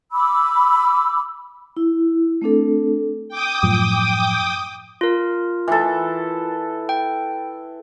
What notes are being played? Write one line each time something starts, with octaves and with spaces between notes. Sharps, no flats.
B5 D6 E6
E4
A3 C4 D4 A4
G5 D6 D#6
F#2 A2 F3
F4 A#4
E3 A4
G5